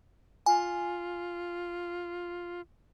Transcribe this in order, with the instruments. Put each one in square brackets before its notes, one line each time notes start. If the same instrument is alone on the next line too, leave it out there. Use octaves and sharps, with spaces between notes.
[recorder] F4 [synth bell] G#5